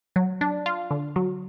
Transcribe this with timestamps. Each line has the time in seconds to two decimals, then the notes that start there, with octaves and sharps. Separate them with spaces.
0.16 F#3
0.41 D4
0.66 F4
0.91 D3
1.16 F#3